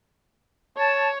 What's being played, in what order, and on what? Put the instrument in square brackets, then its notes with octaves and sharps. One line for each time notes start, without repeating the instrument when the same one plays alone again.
[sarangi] C#5 [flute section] A5